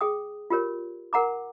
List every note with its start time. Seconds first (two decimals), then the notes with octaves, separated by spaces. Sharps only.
0.01 G#4 G5 D#6
0.50 F4 G4 A#4 C#5
1.13 A#4 F#5 A#5 D6